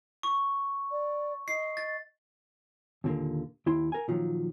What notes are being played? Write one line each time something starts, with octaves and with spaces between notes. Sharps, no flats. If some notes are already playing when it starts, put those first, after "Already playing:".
C#6
D5
D#5 C7
A6
D#2 A#2 D3 A#3
D#2 E4 G5 C6
A#4 G#5
A#2 D#3 F3 F#3